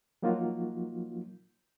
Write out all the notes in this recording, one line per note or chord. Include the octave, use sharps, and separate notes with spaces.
F3 F#3 A#3 D#4 F4 F#4